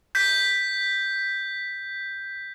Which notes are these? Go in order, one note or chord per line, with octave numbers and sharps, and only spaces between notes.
G6 B6